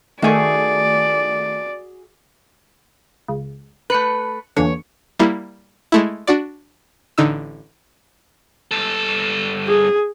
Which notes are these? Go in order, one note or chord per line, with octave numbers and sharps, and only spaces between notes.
D#3 A3 F#4 G#4 D5
C#2
A3 B4 F#6 C#7
E2 A#2 D3 C#5
G3 A#3 E4
G#3 A3 E4
D4 F#4 D5
A1 D3 D#4 E6
G2 A4
G#4